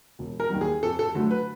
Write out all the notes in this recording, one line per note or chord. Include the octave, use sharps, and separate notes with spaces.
E1
A#4
D#2 D#3 G3
G#4
F2 A4
A4
D3 F#3 A3
B4